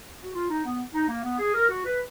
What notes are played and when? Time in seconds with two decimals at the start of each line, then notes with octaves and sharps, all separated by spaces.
0.20 F#4
0.34 F4
0.50 D#4
0.65 B3
0.94 D#4
1.08 A#3
1.23 B3
1.39 G#4
1.54 A#4
1.69 F#4
1.84 B4